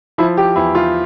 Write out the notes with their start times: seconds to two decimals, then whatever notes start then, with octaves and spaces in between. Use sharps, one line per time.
0.18 F3 E4
0.37 G4
0.56 E2 E4
0.75 F4